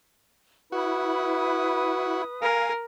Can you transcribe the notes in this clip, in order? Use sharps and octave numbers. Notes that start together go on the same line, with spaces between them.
E4 F#4 B4 D#6
A#4 F5 G#5